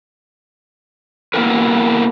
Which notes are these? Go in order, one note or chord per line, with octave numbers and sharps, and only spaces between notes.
A#3 B3 E4 G4 A#4 B4